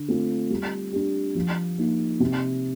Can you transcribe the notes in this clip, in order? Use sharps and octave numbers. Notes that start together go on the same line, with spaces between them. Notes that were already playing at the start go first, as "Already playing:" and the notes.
Already playing: D3
A3 C4 F4
G3
D4 G4
F3
A#3 D#4
C3